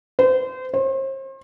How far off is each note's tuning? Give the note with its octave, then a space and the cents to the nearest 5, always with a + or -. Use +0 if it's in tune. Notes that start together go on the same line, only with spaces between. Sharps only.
C5 -30
C5 +40